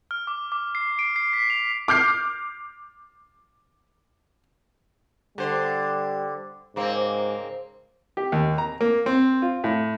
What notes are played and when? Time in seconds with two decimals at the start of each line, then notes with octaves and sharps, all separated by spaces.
0.11 F6
0.27 D6
0.52 D6
0.75 C7
0.99 D7
1.16 C7
1.33 B6
1.50 F7
1.88 D6 F6 G6 C7
5.38 D3 G3 C5
6.76 G#2 C#3 A#3 C4
8.17 G4
8.32 D#2
8.58 A#5
8.81 A#3
9.06 C4
9.42 F4
9.64 A2